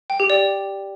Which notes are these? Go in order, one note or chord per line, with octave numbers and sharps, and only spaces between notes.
G5
G4
D5